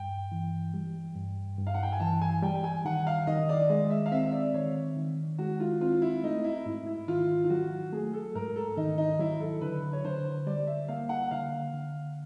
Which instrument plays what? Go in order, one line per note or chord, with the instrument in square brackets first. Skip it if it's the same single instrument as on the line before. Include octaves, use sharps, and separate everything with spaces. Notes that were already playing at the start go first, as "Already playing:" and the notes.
Already playing: [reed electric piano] G2 [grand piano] G5
[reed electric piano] E3
G3
G2
G2
[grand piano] F5
F#5
G5
G#5
[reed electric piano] E3 [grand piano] A5
[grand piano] G#5
[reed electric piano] G3 [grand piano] G5
[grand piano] G#5
[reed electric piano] D#3 [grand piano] F#5
[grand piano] F5
[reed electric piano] D#3 [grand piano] D#5
[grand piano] D5
[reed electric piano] G#3 [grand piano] D#5
[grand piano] E5
F5
[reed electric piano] C4 [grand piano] E5
[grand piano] D5
[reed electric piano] D#3 [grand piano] C#5
[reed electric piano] D#3
[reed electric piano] G#3 [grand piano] F#4
[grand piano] F4
[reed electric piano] C4 [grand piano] F4
[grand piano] E4
[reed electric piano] A3 [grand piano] D#4
[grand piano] E4
[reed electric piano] G#2 [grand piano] E4
[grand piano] E4
[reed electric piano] D#3 [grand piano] F4
[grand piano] F4
[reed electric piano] F#3 [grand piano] F#4
[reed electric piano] A3 [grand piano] G#4
[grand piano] A4
[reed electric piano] G#2 [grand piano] A#4
[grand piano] A4
[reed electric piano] D#3 [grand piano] D#4
[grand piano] D#4
[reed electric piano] F#3 [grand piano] E4
[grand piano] A4
[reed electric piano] D3 [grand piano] B4
[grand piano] C#5
[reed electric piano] D3 [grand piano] C5
[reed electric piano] G3 [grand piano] D5
[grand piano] E5
[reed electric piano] A#3 [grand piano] F5
[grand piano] F#5
[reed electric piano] D3 [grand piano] F5
[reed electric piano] D3